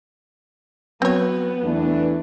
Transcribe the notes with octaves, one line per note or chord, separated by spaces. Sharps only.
F#3 B3 C4 C#5
E2 E3 A3 D4